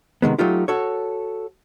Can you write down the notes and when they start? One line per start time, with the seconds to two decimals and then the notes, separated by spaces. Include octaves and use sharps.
0.22 C3 D#3 G#3 B3
0.38 F#3 A3 D#4 F4 G4
0.68 F#4 A4 C#5